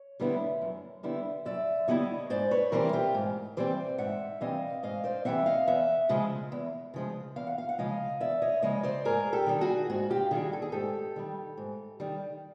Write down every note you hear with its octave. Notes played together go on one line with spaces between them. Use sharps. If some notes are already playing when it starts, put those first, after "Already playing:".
Already playing: C#5
D3 G3 B3 E4
F#2
D3 G3 B3 E4
F#2 D5 E5
D3 G3 B3 E4 C#5 D#5
G#2 C5 D5
B4 C#5
E3 G3 C4 A#4 C5
F4 G4
G#2
E3 G3 C4 C5 D5
G#2 E5 F#5
E3 G3 C4 D#5 F5
G#2 D#5 F5
C5 D5
E3 G3 C4 E5 F#5
D#5 F5
E2 E5 F#5
C#3 F3 G#3
E2
C#3 F3 G#3
E2 F5
F#5
F5
F#5
C#3 F3 G#3 D#5 F5
E2 D5 E5
C#5 D#5
C#3 F3 G#3 C#5 D#5
C5 D5
G#2 G#4 A#4
G4 A4
D#3 G3
F#4 G#4
G#2 F#4
F4 G4
D#3 G3 F#4 G#4
A4
G#4
G#2 G4 A4
D#3 G3
G#2
D#3 G3